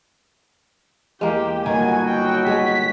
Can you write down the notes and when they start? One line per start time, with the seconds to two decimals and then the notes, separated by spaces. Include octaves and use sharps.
1.21 E2 G#3 A#3 G4
1.66 G1 B2 D#3 F#3 A#3 F#4 G#5
2.07 G5
2.47 G#3 G#4 B6